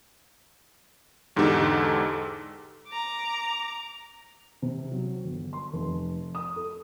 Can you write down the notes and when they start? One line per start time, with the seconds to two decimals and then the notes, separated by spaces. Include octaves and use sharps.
1.36 E2 G#2 D3 D#4 G4 A4
2.87 A#5 D6
4.62 C3
4.91 F#3
5.24 G1
5.53 C6
5.73 F1
6.35 D#6
6.56 A4